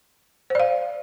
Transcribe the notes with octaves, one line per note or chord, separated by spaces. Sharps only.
C5 D5 F5